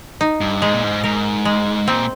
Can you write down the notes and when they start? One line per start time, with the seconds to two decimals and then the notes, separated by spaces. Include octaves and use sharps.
0.21 D#4
0.41 G2
0.62 G#2 G#3
0.74 A#2
0.84 G#2
1.04 G#2 A#4
1.45 G#3
1.88 A#2 C4